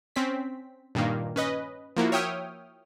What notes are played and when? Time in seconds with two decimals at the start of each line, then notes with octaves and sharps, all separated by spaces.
0.16 C4 C#4 B6
0.95 G2 A#2 D#3 A#3
1.36 C#4 B4 D#5
1.96 F3 A#3 E4 F#4
2.12 C#5 E5 G5 D#6 F6